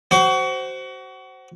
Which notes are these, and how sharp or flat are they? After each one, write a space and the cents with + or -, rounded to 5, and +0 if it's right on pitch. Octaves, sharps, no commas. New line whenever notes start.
F#4 +30 C5 +0